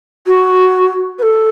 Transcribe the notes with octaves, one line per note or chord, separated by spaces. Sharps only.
F#4
B4
A4